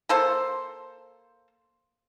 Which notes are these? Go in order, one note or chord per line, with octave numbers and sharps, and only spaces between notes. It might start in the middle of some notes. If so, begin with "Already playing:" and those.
A#3 A4 C5